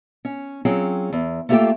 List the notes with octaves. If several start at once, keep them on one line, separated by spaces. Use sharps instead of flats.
C#4
F#3 C4 C#4 F4 G#4 G5
E2
A3 A#3 F4 G4 A4 G5